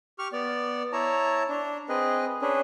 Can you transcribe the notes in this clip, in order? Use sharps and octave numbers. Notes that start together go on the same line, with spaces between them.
G4 C#6 F6
B3 D5
E4 C#5 A5 A#5
D4
C4 G#4 B4 D#5
C#4 D4 G#4 B4